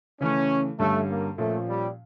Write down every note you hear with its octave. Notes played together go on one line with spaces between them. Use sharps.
C#3 E3 A3 C#4
G2 D3 G3 A3 C#4
A#3
A#2 F3 A3 C#4
G3